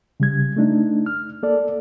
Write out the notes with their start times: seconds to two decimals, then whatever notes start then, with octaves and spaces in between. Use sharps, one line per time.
0.20 C#3 G3 G#6
0.57 A3 D4 D#4
1.06 F6
1.43 A#3 A4 D5